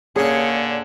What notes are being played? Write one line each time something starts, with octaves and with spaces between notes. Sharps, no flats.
A#2 D3 C#4 G#4 C#5